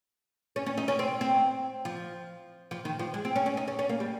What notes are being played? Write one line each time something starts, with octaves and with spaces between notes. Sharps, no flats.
C#4
C#4
D#4
C#4
C4
C4
F3
F3
D#3
F3
G#3
C4
C#4
C#4
D#4
C#4
C#4
A#3
G3